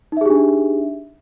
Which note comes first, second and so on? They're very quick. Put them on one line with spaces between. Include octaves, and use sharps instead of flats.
D#4 E5 G#4 G4 D4